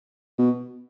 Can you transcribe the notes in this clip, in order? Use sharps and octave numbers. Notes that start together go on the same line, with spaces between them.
B2